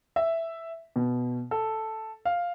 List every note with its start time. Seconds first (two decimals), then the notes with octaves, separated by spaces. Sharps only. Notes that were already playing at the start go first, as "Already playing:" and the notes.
0.16 E5
0.96 B2
1.51 A4
2.25 F5